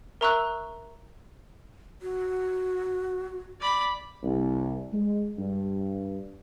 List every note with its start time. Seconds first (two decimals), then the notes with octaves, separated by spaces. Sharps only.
0.21 A#4 E5 A#5 C#6 E6 F#6
2.02 F#4
3.60 D5 B5
4.23 C2
4.93 G#3
5.38 G2